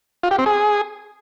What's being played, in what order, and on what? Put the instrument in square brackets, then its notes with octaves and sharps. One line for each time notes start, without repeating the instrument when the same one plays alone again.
[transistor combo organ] F4
G4
C4
G#4